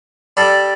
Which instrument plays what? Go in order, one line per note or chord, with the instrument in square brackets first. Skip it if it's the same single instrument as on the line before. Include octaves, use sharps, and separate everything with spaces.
[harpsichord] G3 D4 A4